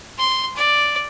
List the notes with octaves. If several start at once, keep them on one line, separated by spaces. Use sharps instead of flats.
C6
D5